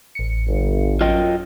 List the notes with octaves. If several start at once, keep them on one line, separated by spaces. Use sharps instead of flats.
A1 C#7
G1
F#2 F4 D#5 G5